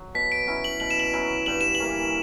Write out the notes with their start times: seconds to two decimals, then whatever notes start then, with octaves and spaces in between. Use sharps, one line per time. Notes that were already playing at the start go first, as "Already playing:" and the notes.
Already playing: F#3
0.15 B2 B6
0.32 D7
0.47 F#3 C#4 E4
0.64 F#7
0.80 B2 F#7
0.91 E7
1.00 F#7
1.13 F#3 C#4 E4
1.46 G2 F#7
1.61 E7
1.75 F#7
1.80 E3 A#3 C#4